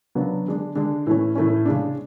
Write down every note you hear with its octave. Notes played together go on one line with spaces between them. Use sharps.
C#3 F#3 B3 D4
D3 G#3 D4
D3 G#3 D4
A2 E3 A3 C#4
A2 E3 A3 C#4
C#3 G#3 D4